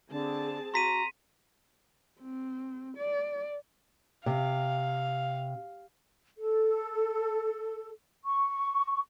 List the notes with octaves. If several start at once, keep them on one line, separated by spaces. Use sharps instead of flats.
D3 C4 G#4 A5
F#4 A#5 C6 B6 D#7
C4
D5
C3 F5
A4
C#6